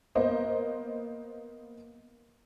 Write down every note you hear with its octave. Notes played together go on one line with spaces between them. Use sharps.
A#3 B3 C5 D#5